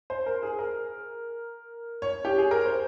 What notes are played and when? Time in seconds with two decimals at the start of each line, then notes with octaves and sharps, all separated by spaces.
0.10 C5
0.26 A#4
0.43 G#4
0.59 A#4
2.02 C#5
2.25 G4
2.38 G#4
2.51 A#4
2.66 C5